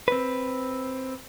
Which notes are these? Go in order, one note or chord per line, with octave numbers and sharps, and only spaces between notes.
C4 B4